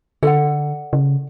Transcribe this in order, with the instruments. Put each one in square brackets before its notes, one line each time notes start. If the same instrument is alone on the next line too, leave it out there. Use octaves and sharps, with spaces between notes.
[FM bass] D3 [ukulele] A4 D5 F#5
[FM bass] C#3